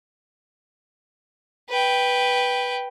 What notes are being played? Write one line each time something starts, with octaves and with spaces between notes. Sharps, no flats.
B4 G5